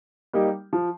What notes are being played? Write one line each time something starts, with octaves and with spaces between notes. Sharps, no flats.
G3 A#3 D#4 G4
F3